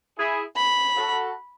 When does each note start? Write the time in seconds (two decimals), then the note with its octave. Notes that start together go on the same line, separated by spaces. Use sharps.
0.17 E4 G#4
0.56 B5
0.96 F#4 A4